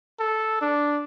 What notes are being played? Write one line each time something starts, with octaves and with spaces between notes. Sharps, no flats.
A4
D4